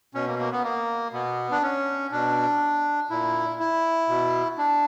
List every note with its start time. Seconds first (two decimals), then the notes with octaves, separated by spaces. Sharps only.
0.14 B2 C#4
0.27 A#3
0.39 A#3
0.51 B3
0.64 A#3
1.13 B2 B3
1.51 D4
1.63 C#4
2.11 B2 D4
3.10 A#2 E4
3.60 E4
4.09 B2
4.58 D4